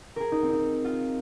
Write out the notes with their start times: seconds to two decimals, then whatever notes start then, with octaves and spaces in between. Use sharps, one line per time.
0.16 G#4 A#4
0.32 D#4
0.42 C4
0.53 D#4
0.85 F4